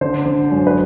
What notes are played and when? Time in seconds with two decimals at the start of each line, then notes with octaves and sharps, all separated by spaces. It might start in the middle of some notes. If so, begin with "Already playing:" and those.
0.01 D3 C5
0.26 D3
0.51 F#2
0.67 B4